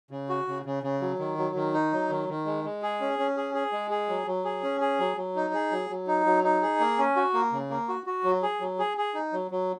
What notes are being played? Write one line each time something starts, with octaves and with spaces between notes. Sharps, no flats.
C#3
F#4
C#3
C#3
C#3
F#3
D#3
F#3
D#3
D#4
F#3
D#3
D#3
G#3
G#3
G#4
C#4
C#4
G#4
G#4
G#3
G#4
F#3
F#3
G#4
C#4
G#4
F#3
F#3
D#4
G#4
F#3
F#3
D#4
F#3
D#4
G#4
A#3
C#4
F#4
A#3
C#3
A#3
F#4
F#4
F#3
G#4
F#3
G#4
G#4
D#4
F#3
F#3